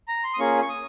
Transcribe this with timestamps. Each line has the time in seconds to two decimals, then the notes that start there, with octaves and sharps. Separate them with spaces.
0.08 A#5
0.24 C6
0.34 D#6
0.38 A#3 C#4 F4 G#4 C#6
0.62 C#6
0.69 D#6